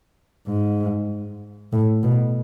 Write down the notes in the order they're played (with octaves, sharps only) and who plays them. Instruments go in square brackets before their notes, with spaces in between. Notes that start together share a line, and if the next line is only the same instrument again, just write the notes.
[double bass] G#2
A2
B2